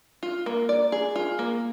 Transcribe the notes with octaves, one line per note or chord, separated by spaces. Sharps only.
F4
A#3
D5
G#4
F4
A#3